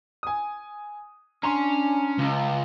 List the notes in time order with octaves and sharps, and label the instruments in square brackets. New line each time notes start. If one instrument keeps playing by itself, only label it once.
[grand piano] G#5 D#6
[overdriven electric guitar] C#4 C#5 [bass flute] D4 [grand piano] A#5 C6
[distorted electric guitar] C#2